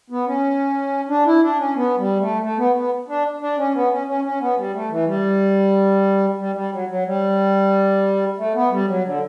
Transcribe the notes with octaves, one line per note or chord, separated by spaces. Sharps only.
B3
C#4
D4
E4
D4
C#4
B3
G3
A3
A3
B3
B3
D4
D4
C#4
B3
C#4
C#4
C#4
B3
G3
A3
E3
G3
G3
G3
F#3
F#3
G3
A3
B3
G3
F#3
D3